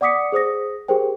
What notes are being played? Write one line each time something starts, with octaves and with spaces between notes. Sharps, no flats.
D5 F#5 D6 D#6 B6 C#7
G#4 C5 D#6 A#6
G4 G#4 A#4 C5 G5